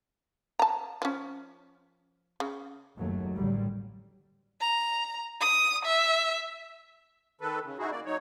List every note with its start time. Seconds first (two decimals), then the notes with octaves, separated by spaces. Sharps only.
0.59 A5 A#5
1.02 F3 C#4
2.40 C#3
2.97 F#1 D#2 F#3 A3
3.36 A1 D3 F#3 G3
4.61 A#5
5.41 D#6
5.85 E5
7.41 D#3 A4 B4
7.64 C#3
7.79 D#4 E4 F#4 G#4
7.91 A#3 D5
8.06 F#3 D#4 C#5